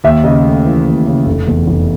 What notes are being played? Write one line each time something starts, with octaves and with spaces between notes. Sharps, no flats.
D#2 E5
C#3 D#5
A3
E3
D#2
C#3
F1
E2
F1